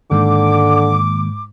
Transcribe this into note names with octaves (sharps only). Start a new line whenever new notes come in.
G#2 D3 D#3 G#3 A#3 D6